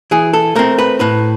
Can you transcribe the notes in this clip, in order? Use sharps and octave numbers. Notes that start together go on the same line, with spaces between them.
E3 G#4
A4
A3 C4 A#4
B4
A2 B4